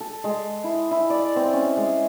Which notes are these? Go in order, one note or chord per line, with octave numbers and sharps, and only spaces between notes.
A4
G#3
E4
E4
D5
C4
C#4
G#3